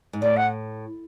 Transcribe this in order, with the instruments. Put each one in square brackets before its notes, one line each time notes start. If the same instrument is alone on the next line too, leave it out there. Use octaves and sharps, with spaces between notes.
[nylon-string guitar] G#2
[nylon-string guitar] A2 [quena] D5
[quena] F#5